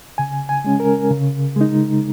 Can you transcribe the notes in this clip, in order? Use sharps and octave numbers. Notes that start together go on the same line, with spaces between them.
C#3 G#5
G#5
G#3 C#4
A#4
C#3
G#3 D#4